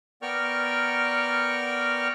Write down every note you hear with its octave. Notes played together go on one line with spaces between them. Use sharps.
B3 A#4 D5 G5 C#6 F6